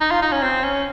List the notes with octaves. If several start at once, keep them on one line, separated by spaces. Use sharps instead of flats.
D#4
F4
D#4
C#4
C4
C#4